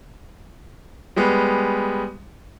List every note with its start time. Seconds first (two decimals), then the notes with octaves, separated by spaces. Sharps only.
1.16 G3 G#3 B3